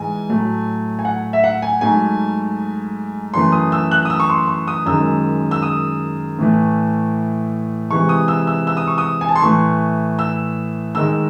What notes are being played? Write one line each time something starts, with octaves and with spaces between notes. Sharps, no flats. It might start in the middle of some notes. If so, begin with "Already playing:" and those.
Already playing: G#2 E3 G#3 G#5
A2 F#3 A3
G#5
F#5
E5
F#5
G#5
G#2 F#3 A3 G#5
F#2 E3 A3 C6
D#6
E6
F#6
D#6
E6
C#6
C6
C#6
D#6
F#2 D#3 G#3 E6
E6
D#6
A2 E3 A3
C3 E3 G#3 C#6
D#6
E6
E6
E6
D#6
C#6
D#6
G#5
A5
C6
A2 E3 A3 C#6
E6
G#2 D#3 G#3 E6